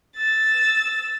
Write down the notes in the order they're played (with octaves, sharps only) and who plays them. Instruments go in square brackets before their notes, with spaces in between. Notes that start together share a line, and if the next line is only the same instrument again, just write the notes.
[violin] E6 A6